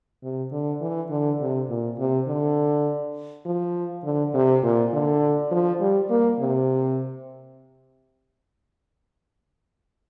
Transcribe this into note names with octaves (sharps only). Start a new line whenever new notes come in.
C3
D3
E3
D3
C3
A#2
C3
D3
F3
D3
C3
A#2
D3
F3
G3
A#3
C3